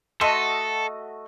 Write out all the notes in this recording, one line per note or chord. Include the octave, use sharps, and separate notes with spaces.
A3 F#4 A4 D#5 A5 C6